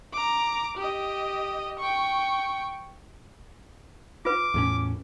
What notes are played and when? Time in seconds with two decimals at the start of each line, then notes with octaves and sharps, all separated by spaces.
0.13 A#5 D6
0.77 G4 D#5
1.79 G5 C#6
4.25 F4 B4 D6
4.54 E2 A2 C#4